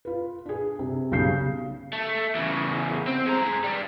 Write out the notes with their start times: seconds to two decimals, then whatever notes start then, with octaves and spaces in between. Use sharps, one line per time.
0.05 F4 B4
0.46 D4 G#4
0.79 C3
1.12 B1 C#3 G3 G6 C7
1.93 A3
2.35 E2 C#3
3.07 C4
3.26 G#3 A#5
3.64 G3 D4